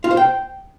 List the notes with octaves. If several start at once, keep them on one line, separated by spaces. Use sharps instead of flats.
F4
C5
G5